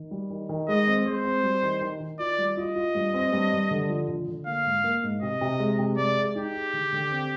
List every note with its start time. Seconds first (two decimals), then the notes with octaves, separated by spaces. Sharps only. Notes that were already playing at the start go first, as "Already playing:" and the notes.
Already playing: D#3
0.11 G3
0.30 D#3
0.49 D#3
0.68 G#3 D#5
0.87 C4
1.06 G#3 C5
1.25 C4
1.43 G3
1.63 D#3
1.81 D#3
2.00 D#3
2.19 F4 D5
2.38 G3
2.57 F4 D#5
2.76 F4
2.95 G2
3.14 C4
3.32 G2
3.52 G2
3.71 D3
3.89 F3
4.09 D3
4.28 D3
4.46 A#3 F5
4.65 G#2
4.84 A#3
5.03 G#2
5.22 C3 D#5
5.41 C3
5.60 G#3
5.79 C3
5.97 G#3 D5
6.16 G#4
6.35 D#4 G4
6.54 G#4
6.73 D3
6.92 D3
7.11 C4